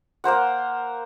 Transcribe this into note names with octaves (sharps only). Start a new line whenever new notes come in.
A#3 A#4 C5 F#5